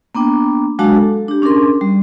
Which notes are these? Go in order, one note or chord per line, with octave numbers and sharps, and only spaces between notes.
A#3 B3 D4 G5
F#3 G#3 D4 F#4 F5 A5
A4
D4 G4
C#4 D4 G#4 A#4 C6
G3